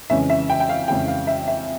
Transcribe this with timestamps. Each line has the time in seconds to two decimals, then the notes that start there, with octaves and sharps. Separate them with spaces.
0.10 F2 C#3 E3 G#3 C#4 E5
0.30 E5
0.50 G5
0.60 G5
0.69 F5
0.88 F2 C#3 E3 G#3 C#4 G5
1.08 F5
1.27 E5
1.48 E5